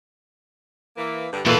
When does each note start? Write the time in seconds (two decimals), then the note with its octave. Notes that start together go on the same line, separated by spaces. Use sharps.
0.97 E3 A#3
1.32 G2 D3 G3
1.46 E2 A#2 E3 G#3 F4 A4 B4